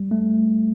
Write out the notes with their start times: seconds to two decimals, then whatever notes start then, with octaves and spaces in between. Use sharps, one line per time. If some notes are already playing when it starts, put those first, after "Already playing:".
Already playing: G3
0.11 A3